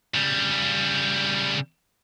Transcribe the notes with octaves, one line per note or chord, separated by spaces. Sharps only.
C#3 G3